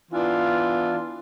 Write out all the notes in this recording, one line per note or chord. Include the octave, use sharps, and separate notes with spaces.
E3 B3 D4 F4